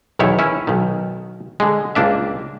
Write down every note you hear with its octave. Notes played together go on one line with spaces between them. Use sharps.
B1 E2 D#3 E4 C#5
C#4 E4
B1 D#3
D3 G#3
C#2 A#3 D4 E5